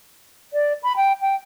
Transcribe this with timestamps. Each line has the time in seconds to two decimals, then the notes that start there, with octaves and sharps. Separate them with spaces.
0.53 D5
0.83 B5
0.96 G5
1.21 G5